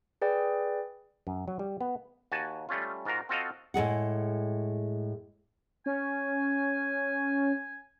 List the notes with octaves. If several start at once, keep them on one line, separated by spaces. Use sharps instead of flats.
G#4 B4 D5 G5
F#2
F#3
G3
B3
D#2 F#4 G#5 A5
G3 A3 C#4 F4
G#2 F4 F#4 A#4 A#5
C4 F4 F#4 A4 D#5 F5
A2 G#3 G#4 F#5
C#4 G#5